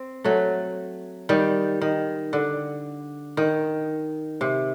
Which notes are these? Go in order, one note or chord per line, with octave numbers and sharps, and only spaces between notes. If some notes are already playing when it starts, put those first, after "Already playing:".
Already playing: C4
F#3 A3
D#3 G3
D#3
D3
D#3
C3